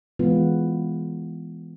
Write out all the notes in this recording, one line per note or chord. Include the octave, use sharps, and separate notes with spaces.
E3 G#3 B3 F4